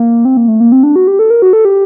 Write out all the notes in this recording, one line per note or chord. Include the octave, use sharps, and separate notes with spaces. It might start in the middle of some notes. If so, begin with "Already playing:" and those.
Already playing: A#3
C4
A#3
A3
A#3
C4
D4
F#4
G4
A4
A#4
F#4
A4
G4